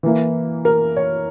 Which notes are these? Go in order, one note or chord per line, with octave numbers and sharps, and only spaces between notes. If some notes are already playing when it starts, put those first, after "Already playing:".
E3 A#3 E4
A#4
C#5